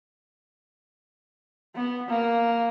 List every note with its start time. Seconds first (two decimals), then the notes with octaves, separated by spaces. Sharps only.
1.75 B3
2.08 A#3